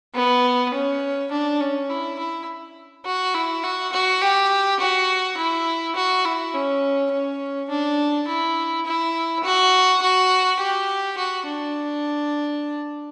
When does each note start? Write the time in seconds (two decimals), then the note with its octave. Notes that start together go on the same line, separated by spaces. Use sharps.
0.15 B3
0.74 C#4
1.32 D4
1.61 C#4
1.90 E4
2.19 E4
3.05 F#4
3.34 E4
3.63 F#4
3.93 F#4
4.21 G4
4.80 F#4
5.37 E4
5.95 F#4
6.25 E4
6.54 C#4
7.11 C#4
7.69 D4
8.27 E4
8.85 E4
9.44 F#4
10.02 F#4
10.59 G4
11.17 F#4
11.47 D4